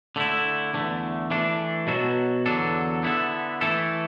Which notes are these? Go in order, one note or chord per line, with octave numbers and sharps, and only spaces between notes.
D3 A3 E4
E2 D3 A3
E3 A3 D4
B2 F#3 B3 F#4 A4
E2 D3 F#3 D4 A4
D3 B3 E4 A4
E3 A3 E4 A4